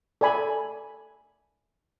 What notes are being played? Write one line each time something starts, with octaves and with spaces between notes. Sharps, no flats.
A4 D5 G#5 B5